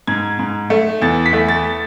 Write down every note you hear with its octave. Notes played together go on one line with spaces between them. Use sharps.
G#2 G#6
G#2
A3
E2 A6
B6
A3
A6